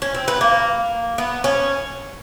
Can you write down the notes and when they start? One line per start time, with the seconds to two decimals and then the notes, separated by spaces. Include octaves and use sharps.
0.02 C#4
0.15 C4
0.28 B3
0.41 A#3
1.18 B3
1.44 C#4